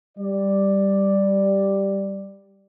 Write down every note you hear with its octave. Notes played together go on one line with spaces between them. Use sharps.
G3 D5